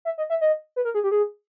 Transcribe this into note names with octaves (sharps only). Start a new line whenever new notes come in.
E5
D#5
E5
D#5
B4
A#4
G#4
G4
G#4